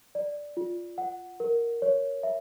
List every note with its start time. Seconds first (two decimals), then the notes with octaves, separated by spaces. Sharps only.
0.15 D5
0.57 F4
0.98 F#5
1.40 A#4
1.82 C#5
2.23 E5